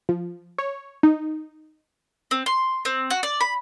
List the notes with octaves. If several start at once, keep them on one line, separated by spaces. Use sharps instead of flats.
F3
C#5
D#4
C4
C6
C4
F#4
D5
B5